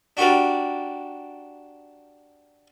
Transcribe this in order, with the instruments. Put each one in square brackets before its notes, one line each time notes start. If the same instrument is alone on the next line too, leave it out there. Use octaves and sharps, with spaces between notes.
[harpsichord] D4 F#4 G4 A#4 D5